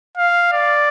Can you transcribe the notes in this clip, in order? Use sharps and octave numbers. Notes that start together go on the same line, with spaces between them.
F5
D5